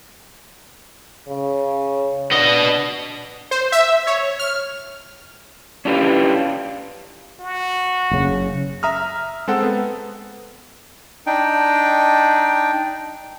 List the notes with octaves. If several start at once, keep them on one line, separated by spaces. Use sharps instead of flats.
C#3
B3 D4 D#5
C5
E5
C#5
F6
C#4 D4 E4 F4 G4 B4
F#4
F#1 C#3
E5 A#5 D#6 F6
G#3 C4 A4 F#5
B3
D4 D#4 G5